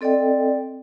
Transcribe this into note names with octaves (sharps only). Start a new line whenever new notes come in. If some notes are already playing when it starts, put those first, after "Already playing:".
C4 A4 D5 D#5 G5